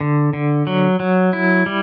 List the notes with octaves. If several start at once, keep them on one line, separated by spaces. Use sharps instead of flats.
D3
D3
F#3
F#3
E4
G3